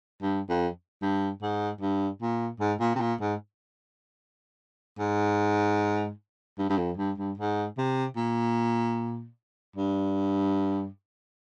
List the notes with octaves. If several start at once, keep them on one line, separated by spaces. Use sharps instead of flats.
G2
F2
G2
G#2
G2
A#2
G#2
A#2
C3
A#2
G#2
G#2
G2
G2
F2
G2
G2
G#2
C3
A#2
G2